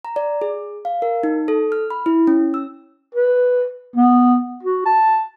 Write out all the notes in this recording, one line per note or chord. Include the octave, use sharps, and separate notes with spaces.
A#5
D5
G#4
F5
A#4
D#4
A4
F6
B5
E4
C#4
E6
B4
B3
F#4
A5